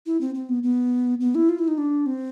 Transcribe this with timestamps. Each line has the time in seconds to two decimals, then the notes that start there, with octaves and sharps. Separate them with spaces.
0.06 E4
0.21 C4
0.35 C4
0.49 B3
0.63 B3
1.21 B3
1.35 E4
1.49 F4
1.59 E4
1.68 D#4
1.78 D4
2.06 C4